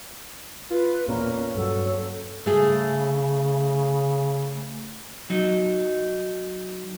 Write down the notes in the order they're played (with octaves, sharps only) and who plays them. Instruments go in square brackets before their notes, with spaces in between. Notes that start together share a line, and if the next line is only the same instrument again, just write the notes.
[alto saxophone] F4 [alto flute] B4
[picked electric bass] E2 A#2 [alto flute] A#3 [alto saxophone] C#4
[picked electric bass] G2 F#3 [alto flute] A4
[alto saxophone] C#5
[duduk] C#3 [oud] A3 G#4
[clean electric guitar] F#3 D#4